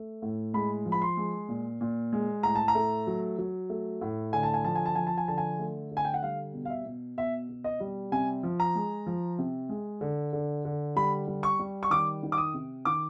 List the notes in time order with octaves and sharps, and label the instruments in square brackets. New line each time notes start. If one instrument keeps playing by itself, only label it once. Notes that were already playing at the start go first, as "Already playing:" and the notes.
Already playing: [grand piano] A3
A2
G#3 B5
F3
B5
C6
G#3
A#2
A#2
G#3
A2 A#5
A5
A#5
A3
F#3
F#3
A3
A2
D3 G#5
A5
G#5
F3 A5
G#5
A5
F3 G#5
A5
G#5
D3 A5
G#5
A3
D3
G#5
G5
F#5
G3 F5
B2
F5
E5
B2
B2 E5
B2
D#5
G3
C3 G#5
F3
A#5
G#3
F3
C3
G#3
D3
D3
D3
G3 B5
G3
C#6
G3
C#6
D#3 D6
D#3
D6
D#6
C3
D#3 D6